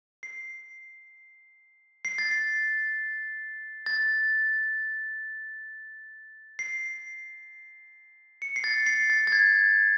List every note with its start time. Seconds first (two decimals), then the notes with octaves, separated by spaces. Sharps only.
0.23 C7
2.05 C7
2.18 A6
2.31 C7
3.86 A6
6.59 C7
8.42 C#7
8.56 C7
8.64 A6
8.86 C7
9.10 A6
9.27 A6
9.32 G#6